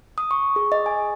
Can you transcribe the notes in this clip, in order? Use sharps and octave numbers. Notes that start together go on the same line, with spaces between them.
D#6
C#6
G#4
D#5
G#5